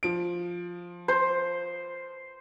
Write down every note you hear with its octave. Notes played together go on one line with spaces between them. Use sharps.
F3 D7
C5